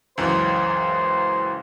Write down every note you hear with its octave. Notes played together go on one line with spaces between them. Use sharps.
C#2 F#2 E3 C5